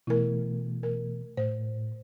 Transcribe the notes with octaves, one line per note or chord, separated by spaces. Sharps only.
B2 E3 A3 E4 A#4
A#4
A2 C5